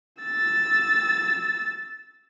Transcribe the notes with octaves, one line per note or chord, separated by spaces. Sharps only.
E6 A6